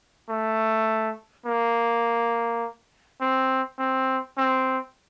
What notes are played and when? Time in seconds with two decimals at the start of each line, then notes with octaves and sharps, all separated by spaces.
0.29 A3
1.46 A#3
3.21 C4
3.79 C4
4.37 C4